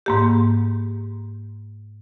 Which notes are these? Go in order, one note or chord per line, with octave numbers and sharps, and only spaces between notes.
G#2 A#3 G4